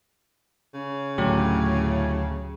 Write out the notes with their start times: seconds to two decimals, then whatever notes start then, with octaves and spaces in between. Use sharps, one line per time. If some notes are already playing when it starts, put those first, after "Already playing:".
0.74 C#3
1.18 D2 A2 F#3 G4